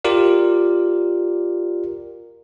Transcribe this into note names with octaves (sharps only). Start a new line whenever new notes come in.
F4 G4 A#4 D5